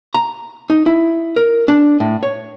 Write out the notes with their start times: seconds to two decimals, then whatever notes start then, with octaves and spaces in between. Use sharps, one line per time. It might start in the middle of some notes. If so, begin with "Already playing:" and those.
0.14 A#5
0.70 D#4
0.86 E4
1.36 A#4
1.68 D4
2.00 A2
2.23 C#5